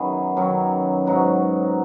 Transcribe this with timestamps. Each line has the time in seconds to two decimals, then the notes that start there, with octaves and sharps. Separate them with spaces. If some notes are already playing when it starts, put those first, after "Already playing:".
Already playing: F#2 D#3 F#3 B3 D#4 G#4
0.37 F#2 D#3 F#3 C#4
1.06 G#2 F#3 D#4 F#4